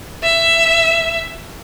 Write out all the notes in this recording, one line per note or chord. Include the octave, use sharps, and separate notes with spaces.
E5